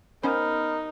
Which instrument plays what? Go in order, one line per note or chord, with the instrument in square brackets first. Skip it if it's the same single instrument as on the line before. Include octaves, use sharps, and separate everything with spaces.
[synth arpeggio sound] B3 C#4 C5 [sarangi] D#4 [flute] A#4 [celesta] B5 F6